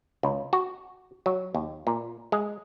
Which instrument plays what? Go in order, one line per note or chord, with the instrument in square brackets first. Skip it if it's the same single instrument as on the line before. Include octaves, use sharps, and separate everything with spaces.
[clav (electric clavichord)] C#2
F#4
F#3
D#2
A#2
G#3